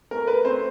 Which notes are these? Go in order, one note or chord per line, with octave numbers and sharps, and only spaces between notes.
A3 A#4
A3 B4
C4 C5